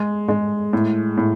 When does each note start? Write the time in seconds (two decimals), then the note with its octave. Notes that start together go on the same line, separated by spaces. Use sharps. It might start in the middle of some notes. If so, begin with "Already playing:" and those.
Already playing: G#3
0.28 G#3
0.73 A2
1.17 A2